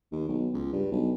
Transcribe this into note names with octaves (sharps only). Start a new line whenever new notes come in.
D#2
B1
C#2
G2
B1